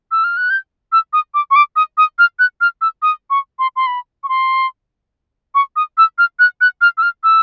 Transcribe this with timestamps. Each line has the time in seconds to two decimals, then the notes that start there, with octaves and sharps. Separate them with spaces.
0.11 E6
0.24 F6
0.37 F#6
0.50 G6
0.92 E6
1.13 D#6
1.34 D6
1.51 C#6
1.56 D6
1.76 D#6
1.98 D#6
2.19 F6
2.39 F#6
2.61 F6
2.81 E6
3.02 D#6
3.30 C#6
3.59 C6
3.76 C6
3.87 B5
4.24 C#6
4.29 C6
5.55 C#6
5.76 D#6
5.98 E6
6.18 F6
6.39 F#6
6.61 F#6
6.81 F6
6.97 E6
7.02 F6
7.24 E6